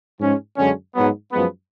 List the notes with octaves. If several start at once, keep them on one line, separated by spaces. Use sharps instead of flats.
G#2 F3 G#3 C#4
F#2 D3 G#3 C#4
G#2 F#3 B3
F#2 F3 G#3 B3